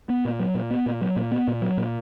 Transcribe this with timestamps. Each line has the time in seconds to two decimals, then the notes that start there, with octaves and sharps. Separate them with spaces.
0.09 B3
0.25 A#2
0.39 F#3
0.55 A#2
0.71 B3
0.86 A#2
1.01 F#3
1.16 A#2
1.32 B3
1.48 A#2
1.62 F#3
1.77 A#2